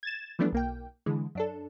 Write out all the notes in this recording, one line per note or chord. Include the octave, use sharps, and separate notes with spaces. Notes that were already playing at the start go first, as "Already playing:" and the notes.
G#6 A6 E7
E3 F3 G3 A3 B3 D4
B1 A#3 G5
D3 E3 G#3
F#2 D4 A4